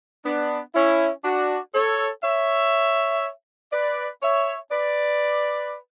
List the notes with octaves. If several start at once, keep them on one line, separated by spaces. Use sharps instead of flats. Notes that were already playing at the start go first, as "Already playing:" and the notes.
B3 D4
C#4 E4
D4 F#4
A4 C#5
C#5 E5
B4 D5
C#5 E5
B4 D5